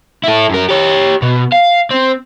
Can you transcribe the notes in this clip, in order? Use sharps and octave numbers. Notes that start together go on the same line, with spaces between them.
E4 A4
F#2 A#4
G4 C#5
B2
F5
C4